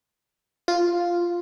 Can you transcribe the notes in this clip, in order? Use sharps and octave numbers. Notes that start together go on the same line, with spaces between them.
F4